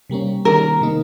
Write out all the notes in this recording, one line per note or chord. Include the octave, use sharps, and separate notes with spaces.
C3 G3 A#3 C#4
D#3 G3 A#3 C#4 A#4
C3 D#3 A#3 D#4